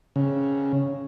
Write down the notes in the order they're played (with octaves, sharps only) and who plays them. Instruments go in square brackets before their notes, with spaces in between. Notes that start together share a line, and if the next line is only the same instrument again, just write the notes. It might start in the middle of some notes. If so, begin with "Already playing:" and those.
[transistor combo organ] C#3